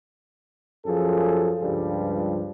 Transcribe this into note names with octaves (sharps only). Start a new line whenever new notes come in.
F#2 F3 G#4 A4
C#2 G2 F3 G3